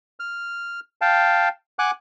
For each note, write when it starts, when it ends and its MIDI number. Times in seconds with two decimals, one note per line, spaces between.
0.20 0.80 89
1.01 1.49 77
1.01 1.49 79
1.01 1.49 81
1.79 1.91 78
1.79 1.91 80
1.79 1.91 86
1.79 1.91 90